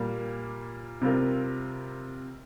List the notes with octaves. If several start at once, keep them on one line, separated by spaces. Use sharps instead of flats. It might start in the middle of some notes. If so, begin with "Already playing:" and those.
Already playing: A#2 G3 A#3
C3 G3 C4 F4 A#4